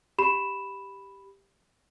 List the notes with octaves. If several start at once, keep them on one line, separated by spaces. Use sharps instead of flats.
G4 B5 E7